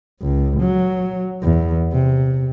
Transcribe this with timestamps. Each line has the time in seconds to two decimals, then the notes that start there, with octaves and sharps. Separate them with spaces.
0.21 C#2
0.60 F#3
1.42 E2
1.92 C3